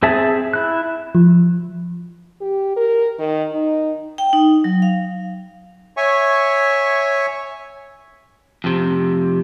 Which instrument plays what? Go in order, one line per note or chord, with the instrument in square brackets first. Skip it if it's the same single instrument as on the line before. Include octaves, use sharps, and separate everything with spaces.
[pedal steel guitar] C4 G#4 E5 A5
E4 F#6
[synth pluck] F3
[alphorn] G4
A#4
D#3
D#4
[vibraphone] G5
D#4
F#3
F5
[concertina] C#5 E5 G#5 C#6
[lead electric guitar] F2 C3